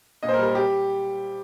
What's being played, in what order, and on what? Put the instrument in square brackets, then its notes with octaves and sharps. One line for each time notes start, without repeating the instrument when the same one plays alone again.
[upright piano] A#2 D#5
C5
A#4
G3
A#4
G4